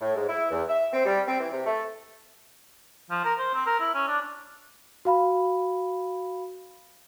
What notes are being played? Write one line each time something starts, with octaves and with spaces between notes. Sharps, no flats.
A2
G#2
E4
E2
E5
C4
G3
C4
E3
C3
A3
F3
A#4
C5
C4
A#4
E4
C#4
D4
F#4 F5 B5